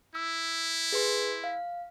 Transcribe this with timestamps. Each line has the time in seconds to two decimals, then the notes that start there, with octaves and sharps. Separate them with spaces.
0.15 E4 E6
0.92 G#4 B4 C6
1.44 F5